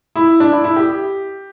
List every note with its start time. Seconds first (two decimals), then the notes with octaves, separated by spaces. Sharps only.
0.16 E4
0.40 D4
0.52 E4
0.64 E4
0.76 G4